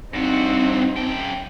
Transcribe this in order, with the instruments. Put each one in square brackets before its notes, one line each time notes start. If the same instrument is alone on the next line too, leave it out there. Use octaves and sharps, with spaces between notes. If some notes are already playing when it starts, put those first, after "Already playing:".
[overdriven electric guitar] G2 F#4 [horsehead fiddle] C4 D#4
[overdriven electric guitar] F#2 G5